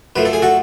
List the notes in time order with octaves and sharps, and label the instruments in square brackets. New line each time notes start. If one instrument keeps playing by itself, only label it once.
[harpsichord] F#2 F3 A3 B4
A4
G#4
F#4 A4